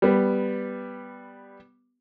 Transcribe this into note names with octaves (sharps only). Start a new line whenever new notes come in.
G3 B3